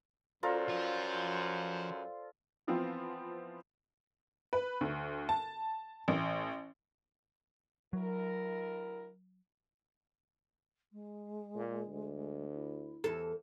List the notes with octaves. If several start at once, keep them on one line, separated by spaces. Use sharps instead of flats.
F#2 F4 A4 A#4 C5 D5
F3
E3 F3 B3 C4 F4
B4
D2
A5
A1
D2 F#3 E4 A#4
G#3
A#2
D2
E4
E2 A4